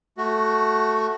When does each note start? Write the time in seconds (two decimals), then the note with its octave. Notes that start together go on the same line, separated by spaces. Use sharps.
0.17 A3 F#4